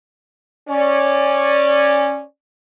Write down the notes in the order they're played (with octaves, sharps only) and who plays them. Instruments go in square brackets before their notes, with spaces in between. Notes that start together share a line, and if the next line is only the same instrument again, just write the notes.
[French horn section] C#4 D5